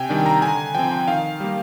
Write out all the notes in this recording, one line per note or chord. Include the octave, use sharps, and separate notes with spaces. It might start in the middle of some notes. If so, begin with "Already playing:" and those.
Already playing: C3 G5 G#5
D#3 G3 D4
A#5
D3 G#5
F3 C4 G5
D#3 F5
G3 A#3